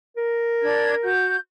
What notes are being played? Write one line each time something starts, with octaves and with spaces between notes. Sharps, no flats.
A#4
D4 G#6
F#4 G6